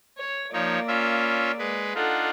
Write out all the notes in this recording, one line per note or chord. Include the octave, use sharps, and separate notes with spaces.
C#5
F3 A#3 D#4 C#5 D5
C#4 F4 E5
G#3 B4
D4 D#4 F4 A4 F#5